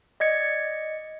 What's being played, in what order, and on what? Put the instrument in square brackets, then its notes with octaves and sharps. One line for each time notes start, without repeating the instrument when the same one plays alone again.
[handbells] D5 D#5 G#6 C#7